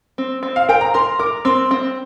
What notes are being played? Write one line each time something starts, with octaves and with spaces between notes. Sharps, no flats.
C4
C4
F5
A#4 G5
A#5
A#4 C6
A#4 D6
C4 C6
C4